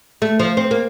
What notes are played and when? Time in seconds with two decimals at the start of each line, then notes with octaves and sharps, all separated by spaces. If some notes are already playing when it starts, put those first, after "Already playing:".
0.22 A3
0.39 F3
0.57 C4
0.71 A#3